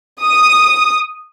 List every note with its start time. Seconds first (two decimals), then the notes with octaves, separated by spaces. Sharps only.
0.23 D#6